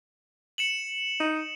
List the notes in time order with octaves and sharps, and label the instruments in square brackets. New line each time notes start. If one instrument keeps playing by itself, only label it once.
[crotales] C#7 E7 F#7
[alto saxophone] D#4